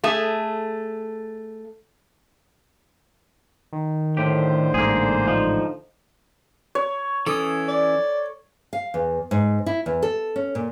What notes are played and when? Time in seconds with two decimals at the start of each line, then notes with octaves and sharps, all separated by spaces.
0.04 A3 G#4 E5
3.73 D#3
4.17 A2 D3 G4 C5
4.74 A1 G#2 A#3 G#4
5.27 F3 D#4
6.75 C#5
7.27 E3 C#4 A4 D#6
7.68 D5
8.73 F5
8.94 E2
9.31 G#2
9.66 E4
9.86 E2
10.03 A4
10.36 C#4
10.55 A#2